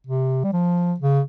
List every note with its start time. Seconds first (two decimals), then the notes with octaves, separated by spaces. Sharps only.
0.07 C3
0.44 G3
0.53 F3
1.00 C#3